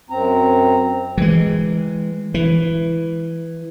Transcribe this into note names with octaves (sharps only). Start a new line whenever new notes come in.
F#2 C4 A#5
E3 G#3
E3